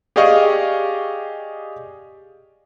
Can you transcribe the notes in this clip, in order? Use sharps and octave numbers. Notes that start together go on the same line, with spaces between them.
G4 G#4 D5 D#5 F5 C#6